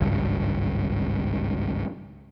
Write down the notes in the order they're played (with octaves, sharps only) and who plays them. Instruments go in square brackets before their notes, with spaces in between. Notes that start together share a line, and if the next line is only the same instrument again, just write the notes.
[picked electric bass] G#1 C#2 G2